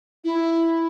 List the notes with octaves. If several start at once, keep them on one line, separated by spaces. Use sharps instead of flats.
E4